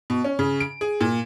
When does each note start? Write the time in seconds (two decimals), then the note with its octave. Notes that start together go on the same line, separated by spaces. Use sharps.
0.10 B2
0.24 C#4
0.39 C#3
0.60 D7
0.81 G#4
1.01 A#2